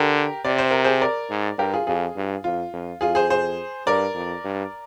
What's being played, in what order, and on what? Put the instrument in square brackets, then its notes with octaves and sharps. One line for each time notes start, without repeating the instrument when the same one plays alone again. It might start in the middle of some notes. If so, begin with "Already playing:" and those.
Already playing: [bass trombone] D3 [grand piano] G4 A#4
[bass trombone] C3 [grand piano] D5
[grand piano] C5
A#4
G#4 C5
A#4 D5
[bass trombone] G#2
[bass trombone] G2 [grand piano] G4 A#4
[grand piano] F4 G#4
[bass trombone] F2 [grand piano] F4 G#4
[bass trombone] G2
[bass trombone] F2 [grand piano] F4
[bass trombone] F2
[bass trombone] F2 [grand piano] F4 G#4
[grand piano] G#4 C5
G#4 C5
[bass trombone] G2 [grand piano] A#4 D5
[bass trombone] F2
G2